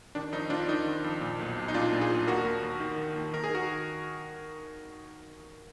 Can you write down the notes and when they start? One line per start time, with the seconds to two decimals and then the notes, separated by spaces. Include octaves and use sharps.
0.15 D#3 D4
0.32 F2 D#4
0.50 F2 D4 F4
0.68 D#3 D#4
0.86 D#3
1.04 F2
1.21 A#2
1.39 B1
1.57 B1
1.68 D#4
1.74 A#2 D4 F4
1.92 A#2
2.01 F4 G#4
2.10 B1
2.27 D#2 F#4 A#4
2.45 D#2
2.63 D#2
2.80 D#3
2.98 D#2
3.16 D#2
3.33 D#3 A#4
3.44 G#4
3.51 D#3 F#4 A#4